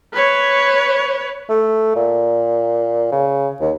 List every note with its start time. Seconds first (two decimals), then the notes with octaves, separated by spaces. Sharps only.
0.13 B4 C#5
1.49 A3
1.96 A#2
3.12 C#3
3.61 D#2